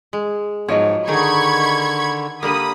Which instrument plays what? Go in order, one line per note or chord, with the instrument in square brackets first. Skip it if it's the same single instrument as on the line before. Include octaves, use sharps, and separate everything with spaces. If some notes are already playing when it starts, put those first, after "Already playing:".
[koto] G#3
[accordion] G#2 [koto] F3 F#3 [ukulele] C#5 D#5
[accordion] D3 [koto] D#3 D#4 G#4 [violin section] B5 C#6 G#6
[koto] D3 G3 A#3 [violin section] B5 D#6